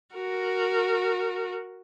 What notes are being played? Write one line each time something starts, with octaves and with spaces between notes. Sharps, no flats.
F#4 A#4